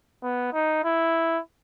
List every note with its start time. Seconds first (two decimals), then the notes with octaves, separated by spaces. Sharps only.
0.23 B3
0.53 D#4
0.84 E4